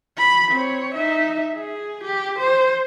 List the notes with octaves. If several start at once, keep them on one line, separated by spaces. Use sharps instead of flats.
B5
C4 C#5
D#4 E5
G#4
G4
C5